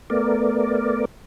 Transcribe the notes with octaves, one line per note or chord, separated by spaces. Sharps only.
A3 B3 A#4 D5